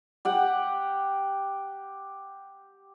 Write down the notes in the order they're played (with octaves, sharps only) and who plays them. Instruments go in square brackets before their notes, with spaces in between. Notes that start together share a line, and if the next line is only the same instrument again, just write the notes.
[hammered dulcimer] G4 F#5 G5